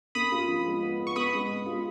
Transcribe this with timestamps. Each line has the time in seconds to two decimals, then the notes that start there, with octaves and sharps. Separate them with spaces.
0.15 A#3 B5 D#6
0.32 F4
0.48 F3
0.66 G#3
0.83 B3
1.00 B3
1.07 C#6
1.15 B3 B5 D#6
1.33 G#3
1.49 G#3
1.66 F4